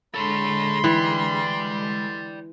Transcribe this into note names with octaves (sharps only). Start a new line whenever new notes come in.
D3 G#3 A4 C#5 B5 C6
E3 D5 G5